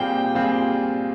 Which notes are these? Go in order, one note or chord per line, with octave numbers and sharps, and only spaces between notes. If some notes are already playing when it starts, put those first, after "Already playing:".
Already playing: A#2 G3 C4 F4 G#4 G5
A#2 G3 C4 F4 G#4